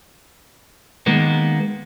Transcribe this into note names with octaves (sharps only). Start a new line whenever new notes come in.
D#3 G#3 A#3 B3